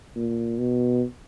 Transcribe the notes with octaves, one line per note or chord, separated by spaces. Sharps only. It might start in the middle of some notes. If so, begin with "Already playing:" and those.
A#2
B2